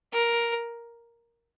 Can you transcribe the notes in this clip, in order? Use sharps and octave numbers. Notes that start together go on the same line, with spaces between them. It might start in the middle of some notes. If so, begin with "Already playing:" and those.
A#4